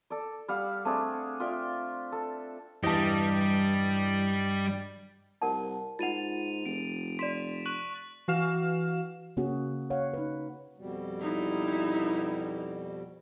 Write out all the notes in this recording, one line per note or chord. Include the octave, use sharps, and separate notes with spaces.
A4 D5
G3 F5 F#5 E6
A3 C4 D4 G#4
F4 D5 E5 G5
A4
E2 G2 G3 G4 D#5 A5
C2 A#4 F#5 A5
G#2 F4 F#5 A6 D#7 F7
F1 D7
D5 C6 B6 E7
C#6 F#6 F#7
E3 F#4 F5 F6 E7
C#3 A#3 C#4 F#4 G#4
C#5 F5 F#5
D#4 B4
F2 B2 G3
D#4 E4